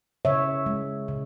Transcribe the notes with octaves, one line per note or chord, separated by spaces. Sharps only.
C#3 C#5 E5
G#3
C#3